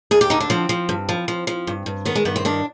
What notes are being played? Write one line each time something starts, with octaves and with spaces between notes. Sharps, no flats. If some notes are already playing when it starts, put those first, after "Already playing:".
D#2 G#4
G4
D3 D#4
D4
F3 C4
F3
G2
F3
F3
F3
G2
G2
D#3 B3
G#3
G2 B3
C4
D#3 D4